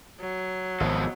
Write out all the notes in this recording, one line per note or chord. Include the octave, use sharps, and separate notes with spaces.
F#3
G#1 F2 B2 A4